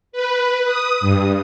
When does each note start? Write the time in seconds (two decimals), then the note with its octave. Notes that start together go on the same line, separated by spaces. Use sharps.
0.12 B4
0.65 D#6
1.01 G2